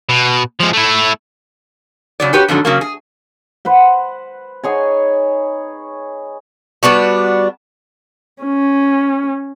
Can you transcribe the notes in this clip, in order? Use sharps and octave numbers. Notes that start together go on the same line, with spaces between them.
B2
F3 G#3
A3 E4
C#3 F#3 D5
F#4 G4 B4 C#5
F2 G#2 D3 F#3
C#3 F#3 A#3
G#4
B4 C5 F#5
D#4 G#4 C#5 G#5
G3 B3 D4 F#4
C#4